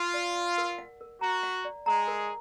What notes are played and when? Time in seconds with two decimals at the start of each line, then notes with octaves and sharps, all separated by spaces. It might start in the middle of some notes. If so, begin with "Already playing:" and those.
Already playing: F4
0.14 D5
0.36 F#5
0.58 A#4
0.78 F#5
1.01 A#4
1.21 F#4 A#5
1.43 F#5
1.65 D5
1.86 G#3 G#4 A#5
2.08 A#4